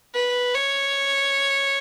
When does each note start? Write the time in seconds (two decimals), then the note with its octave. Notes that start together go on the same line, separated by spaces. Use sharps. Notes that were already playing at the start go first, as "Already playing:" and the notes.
0.14 B4
0.54 C#5